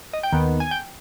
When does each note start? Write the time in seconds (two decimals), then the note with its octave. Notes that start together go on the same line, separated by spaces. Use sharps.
0.13 D#5
0.23 G5
0.32 D#2 D#3 B3
0.60 G#5
0.71 G5